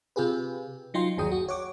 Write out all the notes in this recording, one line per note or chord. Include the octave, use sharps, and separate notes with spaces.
C3 F4 G4 G#4 B4
F#3 D#4 F4 G5 C6
G1 D#2 F#3 G#4 G5 D#6
F#4
C#5 F#5 D6